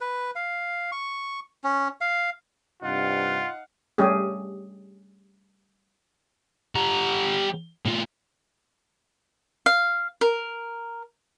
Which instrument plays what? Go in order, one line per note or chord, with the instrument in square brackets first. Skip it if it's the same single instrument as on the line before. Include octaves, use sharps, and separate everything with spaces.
[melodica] B4
F5
C#6
C#4
F5
[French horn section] G2 C3 [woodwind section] D#4 F5 F#5 [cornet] F4
[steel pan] G3 A3 C#4 G4 G#4
[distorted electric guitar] G3 A#5
A2 F4
[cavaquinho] F5
A#4